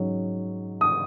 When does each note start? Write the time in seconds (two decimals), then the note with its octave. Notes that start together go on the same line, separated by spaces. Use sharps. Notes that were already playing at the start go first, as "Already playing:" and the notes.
Already playing: G#2 F#3 C#4
0.81 D#6